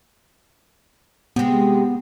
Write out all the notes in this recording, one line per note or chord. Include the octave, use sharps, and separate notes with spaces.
C3 G#3 B3